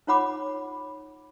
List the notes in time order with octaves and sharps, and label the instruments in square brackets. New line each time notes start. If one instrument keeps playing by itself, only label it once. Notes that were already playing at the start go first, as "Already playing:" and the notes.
[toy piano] D#4 F4 C#5 F#5 B5 D6